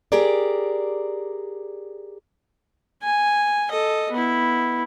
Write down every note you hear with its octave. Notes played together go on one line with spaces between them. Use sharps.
G4 G#4 A#4 D5
G#5
A4 D#5
B3 E4